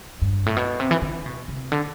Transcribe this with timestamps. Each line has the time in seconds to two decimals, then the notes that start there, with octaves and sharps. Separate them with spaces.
0.22 G2
0.46 A2
0.56 B2
0.80 C3
0.91 E3
1.02 D3
1.26 B2
1.48 C3
1.72 D3